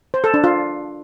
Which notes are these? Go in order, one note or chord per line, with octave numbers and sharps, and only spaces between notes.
C5
A4
D4
F4